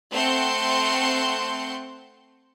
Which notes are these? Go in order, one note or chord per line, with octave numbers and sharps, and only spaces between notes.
A3 C4 F#5 C6 G6 C#7